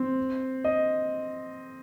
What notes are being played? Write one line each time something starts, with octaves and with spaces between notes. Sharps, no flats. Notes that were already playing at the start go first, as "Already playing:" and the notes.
Already playing: C4
D#5